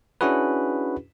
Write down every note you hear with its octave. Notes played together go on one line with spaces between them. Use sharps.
C#4 D4 E4 F#4 G#4 B4